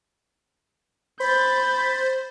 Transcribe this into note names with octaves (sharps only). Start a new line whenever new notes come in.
C5 B5 G6 A6